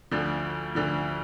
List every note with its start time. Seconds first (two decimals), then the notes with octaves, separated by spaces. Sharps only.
0.11 D2 D3 F3
0.75 D2 D3 F3